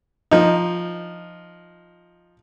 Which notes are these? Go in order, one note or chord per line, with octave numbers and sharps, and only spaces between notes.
F3 D#4